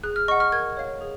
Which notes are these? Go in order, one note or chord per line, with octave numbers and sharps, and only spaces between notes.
G#4 F#6
F6
D#5 F#5 C#6
F6
A#4 G#6
C#5 F5
G#4